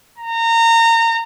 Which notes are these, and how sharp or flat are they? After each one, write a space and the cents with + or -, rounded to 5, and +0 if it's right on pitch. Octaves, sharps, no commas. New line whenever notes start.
A#5 -25